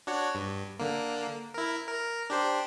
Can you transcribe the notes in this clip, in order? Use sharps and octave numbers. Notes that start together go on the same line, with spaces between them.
D4 F#4 C#5
G2
D3 A#3
E4 A#4
A#4
D4 G4 C5